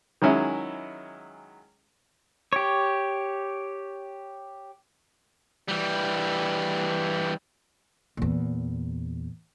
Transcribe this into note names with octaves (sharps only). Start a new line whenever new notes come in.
D#3 F#3 G#3 C#4 E4
G4 C#5
E3 G3
E2 A#2